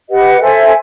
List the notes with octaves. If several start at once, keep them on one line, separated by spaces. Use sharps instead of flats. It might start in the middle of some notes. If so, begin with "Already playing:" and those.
G4 B4 D#5 F#5
A4 C5 E5 G#5